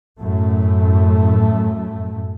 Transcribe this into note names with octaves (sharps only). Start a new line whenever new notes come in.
F#2 A2 A3